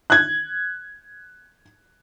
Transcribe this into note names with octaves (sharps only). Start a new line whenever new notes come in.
F#6 G#6